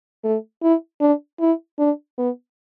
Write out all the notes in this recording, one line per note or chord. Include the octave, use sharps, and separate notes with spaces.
A3
E4
D4
E4
D4
B3